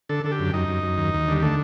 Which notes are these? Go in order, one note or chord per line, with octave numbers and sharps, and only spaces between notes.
D3 A4
D3 A4
G4
F#2
F#2 D#4
F#2
F#2
D#2
D#2
D3 G3
D3 A3